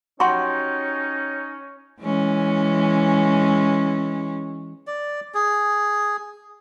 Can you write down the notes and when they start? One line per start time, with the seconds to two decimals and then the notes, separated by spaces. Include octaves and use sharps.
0.20 C#4 D#4 F#4 G4 C6 C#6
2.01 E3 G#3 C#4
4.87 D5
5.34 G#4